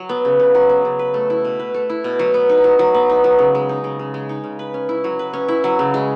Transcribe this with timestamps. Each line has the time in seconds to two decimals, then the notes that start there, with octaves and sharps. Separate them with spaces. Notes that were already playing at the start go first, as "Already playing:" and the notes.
Already playing: F#3
0.09 B3
0.25 C#3
0.40 C#3
0.55 F#3
0.69 B3
0.85 C#3
0.99 B4
1.14 A3
1.30 E4
1.45 B2
1.59 B4
1.74 A3
1.90 E4
2.04 B2
2.19 F#3
2.34 B3
2.49 D#4
2.64 F#3
2.79 F#3
2.94 B3
3.09 D#4
3.24 F#3
3.39 C#3
3.55 G#3
3.69 D#4
3.84 C#3
3.99 C#3
4.14 G#3
4.29 D#4
4.44 C#3
4.59 B4
4.74 C#4
4.89 E4
5.04 F#3
5.19 B4
5.33 C#4
5.48 E4
5.64 F#3
5.79 C#3
5.94 G#3